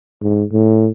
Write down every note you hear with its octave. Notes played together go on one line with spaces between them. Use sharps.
G#2
A2